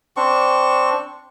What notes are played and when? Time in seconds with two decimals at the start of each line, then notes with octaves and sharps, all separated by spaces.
0.17 C4 D4 C#6